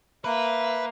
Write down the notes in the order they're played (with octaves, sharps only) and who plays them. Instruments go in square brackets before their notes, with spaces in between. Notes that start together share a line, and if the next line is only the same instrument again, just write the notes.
[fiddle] A#3 [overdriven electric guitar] B4 [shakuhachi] E5